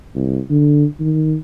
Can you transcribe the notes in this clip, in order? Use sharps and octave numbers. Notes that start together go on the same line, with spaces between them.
C2
D3
D#3